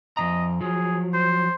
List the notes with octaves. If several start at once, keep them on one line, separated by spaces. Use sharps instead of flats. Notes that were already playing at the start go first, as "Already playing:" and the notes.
F2 G#2 D#5 A#5
F3 F#3 G#4
C5